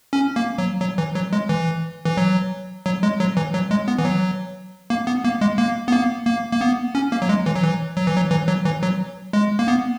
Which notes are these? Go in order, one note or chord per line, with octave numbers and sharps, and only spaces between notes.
C#4
A#3
F#3
F#3
E3
F#3
G#3
E3
E3
F#3
F#3
G#3
F#3
E3
F#3
G#3
B3
E3
F#3
A#3
B3
A#3
G#3
A#3
B3
A#3
A#3
A#3
B3
C#4
A#3
F#3
G#3
E3
F#3
E3
F#3
E3
F#3
E3
F#3
E3
F#3
G#3
A#3
B3